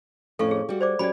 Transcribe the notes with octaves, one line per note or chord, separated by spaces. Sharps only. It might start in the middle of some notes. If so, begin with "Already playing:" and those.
F2 A2 C#4 A4 F5 C#6
G#4
G3 F#4
C5 D5 D6
F#3 C#4 G4 D5 B5